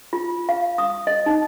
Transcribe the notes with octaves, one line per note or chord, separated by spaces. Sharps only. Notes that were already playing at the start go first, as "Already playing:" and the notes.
F4
F5
D#6
D#5
D#4